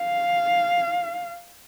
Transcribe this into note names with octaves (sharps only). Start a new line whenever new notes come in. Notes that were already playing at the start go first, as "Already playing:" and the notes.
Already playing: F5